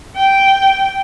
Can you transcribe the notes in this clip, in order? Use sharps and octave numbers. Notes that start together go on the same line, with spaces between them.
G5